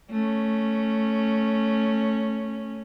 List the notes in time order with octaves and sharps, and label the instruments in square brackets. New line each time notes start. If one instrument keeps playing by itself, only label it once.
[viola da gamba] A3 C#4